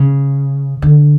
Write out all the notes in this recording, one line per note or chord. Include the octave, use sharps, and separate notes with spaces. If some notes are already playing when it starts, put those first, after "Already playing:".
Already playing: C#3
D3